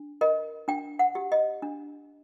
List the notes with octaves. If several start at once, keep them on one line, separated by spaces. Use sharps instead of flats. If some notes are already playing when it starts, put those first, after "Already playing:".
Already playing: D4
A#4 D#5
D4 G5
F#5
G4
D#5
D4